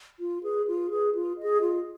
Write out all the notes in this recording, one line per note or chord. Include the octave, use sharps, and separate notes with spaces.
F4
G#4 B4
F4
G#4 B4
F4
G#4 D#5
F4